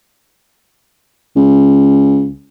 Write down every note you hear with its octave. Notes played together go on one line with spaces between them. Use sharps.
C#2